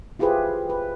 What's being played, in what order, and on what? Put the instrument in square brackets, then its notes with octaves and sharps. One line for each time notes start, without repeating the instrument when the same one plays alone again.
[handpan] E4 F4 G4 G#4 B4 C5
B4